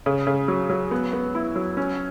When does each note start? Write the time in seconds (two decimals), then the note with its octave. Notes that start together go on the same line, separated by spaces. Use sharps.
0.06 C#3
0.27 C#3
0.48 F#3
0.70 F#3
0.91 B3
1.13 B3
1.35 E4
1.56 F#3
1.77 C#4